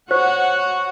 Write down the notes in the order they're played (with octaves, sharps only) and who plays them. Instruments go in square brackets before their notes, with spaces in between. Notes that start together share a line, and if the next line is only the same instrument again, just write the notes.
[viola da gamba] F#4 [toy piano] C5 [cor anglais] C#5 [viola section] F#5